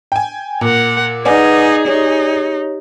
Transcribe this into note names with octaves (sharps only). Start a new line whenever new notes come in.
G5 G#5
A#2 A#4 F#5
D#4 G#4 B4 D5 F#5 G#5
D#4 G4 C#5